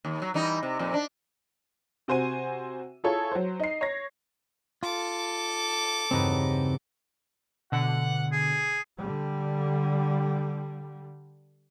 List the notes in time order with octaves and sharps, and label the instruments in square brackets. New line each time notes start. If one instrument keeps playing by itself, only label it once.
[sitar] D#2
F#3
E3 G3 D#4
C3
F2 A#2
D4
[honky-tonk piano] C3 F#4 C5 G#5 D#7
E4 F4 G#4 A4 C#5
F#3 C5
D#4 C7
C#5 A#6
[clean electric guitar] F4 [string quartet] A4 D6
[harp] E2 G2 C#3 [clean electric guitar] C4 D#4 B4
[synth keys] B2 D3 [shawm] F#5
[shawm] G#4
[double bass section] D3 G3